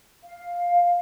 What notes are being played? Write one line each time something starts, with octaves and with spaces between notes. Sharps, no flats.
F5